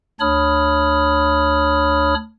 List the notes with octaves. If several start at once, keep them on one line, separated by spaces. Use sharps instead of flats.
D2 D4 C#5 B5 D#6 F6